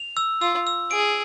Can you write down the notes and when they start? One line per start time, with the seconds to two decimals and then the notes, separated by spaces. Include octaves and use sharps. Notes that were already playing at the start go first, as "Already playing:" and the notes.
Already playing: F7
0.17 E6
0.42 F4 E6
0.67 E6
0.91 G#4 D7